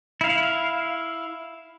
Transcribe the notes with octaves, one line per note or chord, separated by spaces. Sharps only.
E4 F5